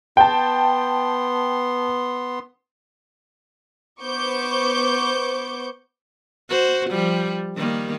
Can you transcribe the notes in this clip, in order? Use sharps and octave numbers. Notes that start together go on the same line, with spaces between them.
B3 G5 A5 C6
B3 C5 C#6 D6 G6
F#4 C5
F3 G3
D#3 G3 A#3